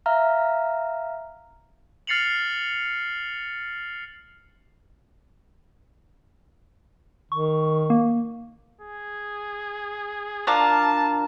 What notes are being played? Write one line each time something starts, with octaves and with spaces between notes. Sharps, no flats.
E5 F5 A#5 F6
F6 A6 C7 C#7 F7 F#7
D#3 C#6
A#3
G#4
D4 F4 A#4 A5